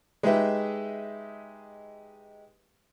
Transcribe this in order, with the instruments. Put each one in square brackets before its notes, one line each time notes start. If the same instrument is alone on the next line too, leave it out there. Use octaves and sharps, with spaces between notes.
[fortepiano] G#3 D#4 G4 G#4 B4 E5